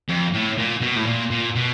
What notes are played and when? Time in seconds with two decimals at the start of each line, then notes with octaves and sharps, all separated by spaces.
0.09 F2
0.34 A2
0.58 A#2
0.82 B2
0.97 A2
1.07 A#2
1.31 A#2
1.56 B2